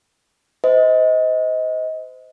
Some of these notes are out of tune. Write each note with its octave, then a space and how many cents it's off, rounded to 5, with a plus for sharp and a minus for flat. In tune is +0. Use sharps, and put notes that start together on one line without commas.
C5 -30 D#5 +25